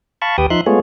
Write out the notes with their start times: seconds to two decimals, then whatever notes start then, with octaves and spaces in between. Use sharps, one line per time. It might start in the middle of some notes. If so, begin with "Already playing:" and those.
0.22 F5 A5 B5 C#6
0.38 D#2 G4 B4 G5 D#6
0.50 F3 D#4 E5 C6 F#6
0.66 G#3 A3 B3 F4 G#4 C#5